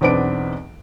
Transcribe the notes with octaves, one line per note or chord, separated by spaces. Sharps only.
B1 E2 C4 D4 B4 D7